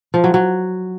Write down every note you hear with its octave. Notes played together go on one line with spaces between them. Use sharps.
F3
F#3
F#3